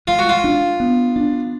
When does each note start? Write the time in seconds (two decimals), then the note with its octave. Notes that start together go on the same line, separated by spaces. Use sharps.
0.08 G#3 F4
0.19 F#4
0.29 F4
0.44 D4
0.80 B3
1.16 D4